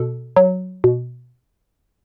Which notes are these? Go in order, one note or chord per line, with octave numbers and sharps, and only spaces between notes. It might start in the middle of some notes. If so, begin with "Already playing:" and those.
Already playing: B2 A4
F#3
B2